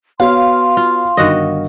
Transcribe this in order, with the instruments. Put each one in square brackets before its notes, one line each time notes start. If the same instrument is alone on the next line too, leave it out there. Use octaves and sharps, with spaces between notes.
[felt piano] B3 F#4 C#5 [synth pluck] F5 [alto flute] C6
[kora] F4
[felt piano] G1 [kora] D#3 F#4 D#5